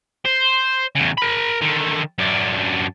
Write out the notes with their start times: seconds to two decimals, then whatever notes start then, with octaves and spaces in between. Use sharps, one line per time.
0.25 C5
0.95 E2 C#3
1.18 A#4 B5
1.61 D3 D#3
2.19 F#2 D4